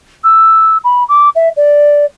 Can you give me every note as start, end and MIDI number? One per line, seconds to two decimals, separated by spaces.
0.23 0.77 88
0.84 1.03 83
1.08 1.29 86
1.35 1.49 76
1.56 2.05 74